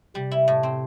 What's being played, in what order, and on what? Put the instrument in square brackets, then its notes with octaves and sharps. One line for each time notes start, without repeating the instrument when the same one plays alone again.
[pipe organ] C3 [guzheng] G3
[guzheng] E4
A2
C4